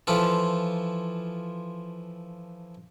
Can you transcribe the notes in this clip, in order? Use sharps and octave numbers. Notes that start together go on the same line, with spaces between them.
E3 F3 F4 A4